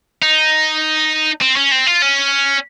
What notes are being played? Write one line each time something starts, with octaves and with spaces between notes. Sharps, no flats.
D#4
C4
C#4
C4
F4
C#4